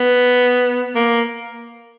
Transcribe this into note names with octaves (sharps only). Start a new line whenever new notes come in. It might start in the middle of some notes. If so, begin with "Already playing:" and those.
Already playing: B3
A#3